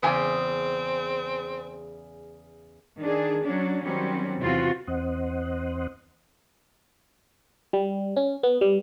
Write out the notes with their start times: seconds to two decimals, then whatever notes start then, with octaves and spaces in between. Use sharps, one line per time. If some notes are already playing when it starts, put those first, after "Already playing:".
0.03 E2 C#3 C4 G#5
3.01 D#3 D4 G#4
3.45 F#3 C#4 D4
3.82 D#3 F#3 G3 C4 C#4
4.39 E2 C3 E3 C4 F4 F#4
4.87 E2 C4 C5 D#5 F#5
7.73 G3
8.16 C#4
8.43 B3
8.61 G3